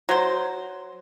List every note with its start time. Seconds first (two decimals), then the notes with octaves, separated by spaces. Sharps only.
0.09 F#3 C5